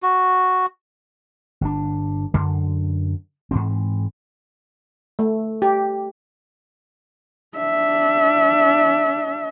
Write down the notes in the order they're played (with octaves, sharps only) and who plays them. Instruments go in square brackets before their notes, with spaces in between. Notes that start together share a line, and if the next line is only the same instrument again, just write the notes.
[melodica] F#4
[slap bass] G1 D4
F#2 D3
G#2 E3 C4
[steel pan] A3
G4
[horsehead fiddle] D4 E5